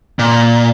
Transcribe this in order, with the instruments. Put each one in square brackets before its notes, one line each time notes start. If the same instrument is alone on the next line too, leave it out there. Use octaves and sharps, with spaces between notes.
[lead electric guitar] A#2